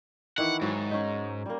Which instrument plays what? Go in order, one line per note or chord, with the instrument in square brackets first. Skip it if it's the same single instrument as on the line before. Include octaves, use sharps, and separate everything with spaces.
[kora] D#3 E3 E4 [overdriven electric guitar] F#5
[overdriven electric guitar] G#2 [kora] F#3
[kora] C#4 D#4
G3 A#3